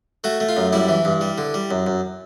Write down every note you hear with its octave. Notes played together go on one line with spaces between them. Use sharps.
A3 F#4
A3
F4
F#2
G3 E4
E3
G2
G3
D3
G3
F#2
F#2